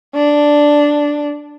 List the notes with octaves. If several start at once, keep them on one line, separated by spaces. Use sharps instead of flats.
D4